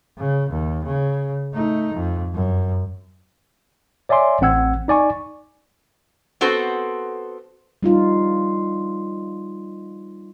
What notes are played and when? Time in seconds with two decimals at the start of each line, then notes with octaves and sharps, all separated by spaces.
0.18 C#3
0.50 D#2
0.85 C#3
1.53 A3 D#4
1.94 F2
2.34 F#2
4.09 C#5 D5 E5 G#5 C6 D6
4.41 A1 C4 F#5 E6 G#6
4.88 D#4 D5 G#5 C#6
6.41 B3 C4 F#4 A4 C5
7.83 G3 D#4 F4